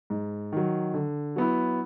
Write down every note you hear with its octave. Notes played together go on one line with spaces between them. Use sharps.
G#2
D#3 F#3
D3
F#3 B3 E4